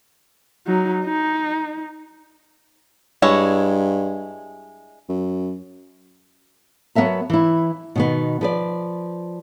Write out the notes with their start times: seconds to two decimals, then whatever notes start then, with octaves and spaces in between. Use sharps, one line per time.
0.67 F#3 D#4
1.05 D#4
3.22 G2 G#3 E4 C#5
5.09 F#2
6.95 F#3 B3 A#4 E5 A5
7.30 E3 E4
7.96 B2 D#3 B3
8.41 F3 B4 D5